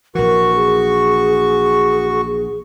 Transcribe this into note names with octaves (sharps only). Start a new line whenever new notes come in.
A#1 E3 F#4 A#4 C#6
G#4